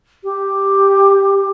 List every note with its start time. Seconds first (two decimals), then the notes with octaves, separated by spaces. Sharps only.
0.24 G4